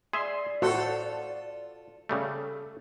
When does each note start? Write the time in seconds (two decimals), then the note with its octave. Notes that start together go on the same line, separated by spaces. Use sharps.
0.13 G#4 D5 E5 C6
0.62 A2 F4 F#4 A4 C5 F#5
2.09 C#3 G3 A3 A4